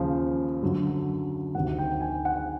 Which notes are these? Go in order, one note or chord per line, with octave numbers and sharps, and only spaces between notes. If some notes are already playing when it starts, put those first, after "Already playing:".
Already playing: D#2 C#3 F3
F#2 D3 F#3
D2 C3 D#3 F#5
G5
G#5
F#5